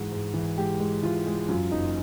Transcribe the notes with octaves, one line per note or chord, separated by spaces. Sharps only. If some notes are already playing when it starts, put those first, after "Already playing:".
Already playing: G#2 E3 F#4
G#2
E3
G#3 G4
G#3
E3 F4
G#3
F#2 F4
F#1 D#4